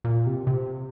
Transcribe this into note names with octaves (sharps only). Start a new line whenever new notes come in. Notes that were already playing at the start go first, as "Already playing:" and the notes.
A#2
C3
C3